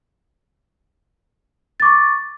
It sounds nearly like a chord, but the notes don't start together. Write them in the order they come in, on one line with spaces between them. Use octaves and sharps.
A6 D6 C#6